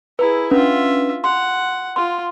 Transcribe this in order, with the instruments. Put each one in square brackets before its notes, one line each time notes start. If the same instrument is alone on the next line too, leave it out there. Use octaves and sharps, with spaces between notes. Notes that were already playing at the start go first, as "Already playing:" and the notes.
[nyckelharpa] E4 G#4 [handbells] B4 A#5
[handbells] C#4 D4 B4 [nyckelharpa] F4 E5
[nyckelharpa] F#5 [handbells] C6
[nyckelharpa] F4 [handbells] C6